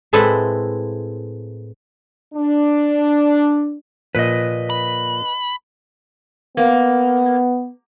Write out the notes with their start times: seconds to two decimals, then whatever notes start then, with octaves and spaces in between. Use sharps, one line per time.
0.13 A2 G#3 C4 E4 A4 B4
2.35 D4
4.15 A#2 F3 B4 D#5
4.70 B5
6.57 A#3 B3